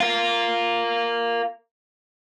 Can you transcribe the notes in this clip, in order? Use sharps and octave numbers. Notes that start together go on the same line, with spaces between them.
F4 A#4 F5